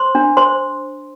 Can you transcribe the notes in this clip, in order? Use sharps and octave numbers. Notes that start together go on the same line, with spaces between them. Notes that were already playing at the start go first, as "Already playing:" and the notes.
Already playing: C5 C6
D4
C5 C6